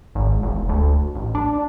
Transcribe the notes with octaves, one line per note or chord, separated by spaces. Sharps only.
G#1
E1
D2
A1
D4